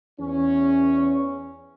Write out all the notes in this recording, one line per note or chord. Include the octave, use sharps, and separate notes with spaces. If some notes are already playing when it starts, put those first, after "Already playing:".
E2 C#4